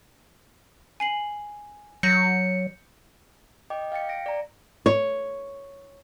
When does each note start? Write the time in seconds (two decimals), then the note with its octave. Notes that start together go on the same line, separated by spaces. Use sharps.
1.00 G#5 C7 F#7
2.03 F#3 G6 A#6 C#7
3.70 D#5 G5 D6
3.92 F5 G5 A6 C#7
4.09 A#6 D7
4.26 D5 A#5
4.86 C#5